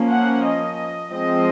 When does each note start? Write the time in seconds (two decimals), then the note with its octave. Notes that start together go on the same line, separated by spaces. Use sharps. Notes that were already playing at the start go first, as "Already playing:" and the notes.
Already playing: F3 A#3 C#4
0.10 F#5
0.44 D#5
1.12 F3 G#3 C4 D#5